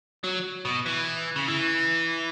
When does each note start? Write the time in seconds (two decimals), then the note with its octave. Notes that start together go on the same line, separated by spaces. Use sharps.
0.24 F#3
0.65 B2
0.86 E3
1.36 C#3
1.48 E3